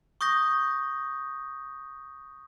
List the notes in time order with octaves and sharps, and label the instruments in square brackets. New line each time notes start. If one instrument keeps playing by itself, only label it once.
[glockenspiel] C#6 D#6 G6 A#6